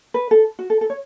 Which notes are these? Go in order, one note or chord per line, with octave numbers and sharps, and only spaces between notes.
B4
A4
F#4
A4
A4
C#5